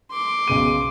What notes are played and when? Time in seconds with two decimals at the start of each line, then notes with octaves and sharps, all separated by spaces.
0.11 C6 D6
0.48 B1 C#3 D#7